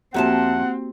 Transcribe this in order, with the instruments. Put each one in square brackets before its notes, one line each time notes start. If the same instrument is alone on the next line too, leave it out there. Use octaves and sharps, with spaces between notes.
[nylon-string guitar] F2 E5 A5 [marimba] A#3 F#4 G4 [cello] C4 [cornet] F#5